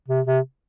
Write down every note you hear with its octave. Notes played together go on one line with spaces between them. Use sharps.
C3
C3